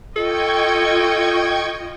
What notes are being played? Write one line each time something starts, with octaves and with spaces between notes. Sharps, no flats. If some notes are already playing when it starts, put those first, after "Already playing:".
F4 A4 D#5 G5 C#6 G#6